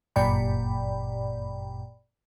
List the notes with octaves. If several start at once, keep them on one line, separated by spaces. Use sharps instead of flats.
G1 F#2 A#2 D5 G5 B5